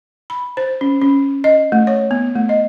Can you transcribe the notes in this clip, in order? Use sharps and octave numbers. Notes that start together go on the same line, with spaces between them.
B5
C5
C#4
C#4
D#5
A3
C#5
B3
A3
D#5